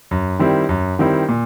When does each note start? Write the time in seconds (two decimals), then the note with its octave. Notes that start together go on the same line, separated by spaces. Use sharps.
0.11 F#2
0.39 D#3 G3 C4 E4
0.69 F#2
0.99 D#3 G3 C4 E4
1.29 A#2